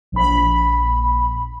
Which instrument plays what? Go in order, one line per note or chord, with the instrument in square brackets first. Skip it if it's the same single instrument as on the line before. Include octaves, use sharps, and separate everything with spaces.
[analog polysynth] A#1 B5